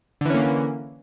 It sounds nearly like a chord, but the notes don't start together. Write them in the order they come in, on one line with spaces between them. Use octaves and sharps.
D3 E3 C#4 A#3